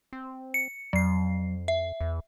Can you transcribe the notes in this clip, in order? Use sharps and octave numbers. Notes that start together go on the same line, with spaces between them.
C4
C#7
F2 F#3 C7
E5
E2